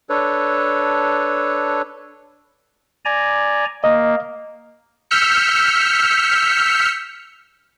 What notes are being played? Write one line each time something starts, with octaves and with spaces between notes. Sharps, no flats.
D4 A4 B4 C#5
D5 G#5 A#5
A#3 D#5
E6 F6 G6 B6 C#7